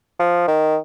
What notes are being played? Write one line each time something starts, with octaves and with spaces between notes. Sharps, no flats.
F3
D#3